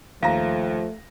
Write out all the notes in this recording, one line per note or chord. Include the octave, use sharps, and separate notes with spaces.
D#2 F3 A3 F5 A#5 A#6